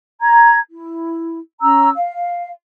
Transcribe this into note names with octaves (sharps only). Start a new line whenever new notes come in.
A#5 G#6
E4
C#4 A#5 E6
F5